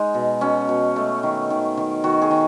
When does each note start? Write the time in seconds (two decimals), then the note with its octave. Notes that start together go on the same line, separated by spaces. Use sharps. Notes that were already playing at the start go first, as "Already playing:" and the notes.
Already playing: G#3 D#4
0.14 B2
0.41 B2 C#4
0.69 B2
0.96 A3
1.23 D#3
1.50 D#3
1.77 D#3
2.04 D#3 F#4
2.22 G#4
2.31 D#3